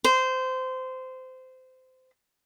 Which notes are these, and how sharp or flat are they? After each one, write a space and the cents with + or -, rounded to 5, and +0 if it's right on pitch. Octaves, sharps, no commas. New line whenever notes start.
C5 -20